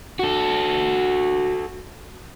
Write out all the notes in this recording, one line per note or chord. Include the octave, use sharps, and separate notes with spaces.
F#4 A4